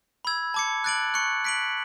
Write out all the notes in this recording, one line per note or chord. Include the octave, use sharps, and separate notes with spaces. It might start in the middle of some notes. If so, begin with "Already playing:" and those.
B5 E6 G#6
A5 D6 G#6 C#7
F#6 A6 D7 F#7
C#6 F#6 C#7
F#6 B6 D7 F#7